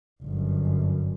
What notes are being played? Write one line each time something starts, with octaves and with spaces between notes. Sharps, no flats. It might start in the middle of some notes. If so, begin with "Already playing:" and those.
G1 F#2